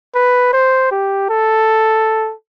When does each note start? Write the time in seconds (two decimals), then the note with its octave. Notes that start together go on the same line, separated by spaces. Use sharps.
0.15 B4
0.53 C5
0.92 G4
1.30 A4